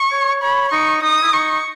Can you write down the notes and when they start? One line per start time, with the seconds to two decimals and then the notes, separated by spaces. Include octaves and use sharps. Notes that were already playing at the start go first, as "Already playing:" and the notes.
Already playing: C#6
0.12 C#5
0.42 C#5 B5
0.72 D#4 C#6
1.03 D#4 D#6
1.23 E4
1.33 D#4 C#6